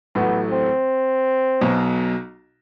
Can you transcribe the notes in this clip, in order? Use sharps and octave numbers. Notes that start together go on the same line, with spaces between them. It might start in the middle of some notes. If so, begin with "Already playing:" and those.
A1 A2 F#3 A3 B3
C4
B1 B2 F#3